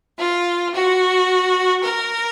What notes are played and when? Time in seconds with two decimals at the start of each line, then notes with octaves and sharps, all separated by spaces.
0.18 F4
0.73 F#4
1.82 A#4